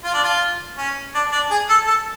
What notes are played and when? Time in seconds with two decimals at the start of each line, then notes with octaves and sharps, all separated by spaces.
0.04 F4
0.14 D4
0.24 F4
0.78 C#4
1.15 D4
1.32 D4
1.51 G#4
1.69 A4
1.87 A4